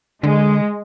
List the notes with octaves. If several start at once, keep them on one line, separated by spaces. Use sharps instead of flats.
D3 G#3